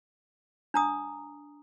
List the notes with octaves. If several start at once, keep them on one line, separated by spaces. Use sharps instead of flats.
D4 A#5 D#6